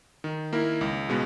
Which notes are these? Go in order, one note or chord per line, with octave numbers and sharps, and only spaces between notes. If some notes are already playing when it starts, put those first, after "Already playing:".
D#3
A#3 E4 A#4
C#2
B2 G#3 B3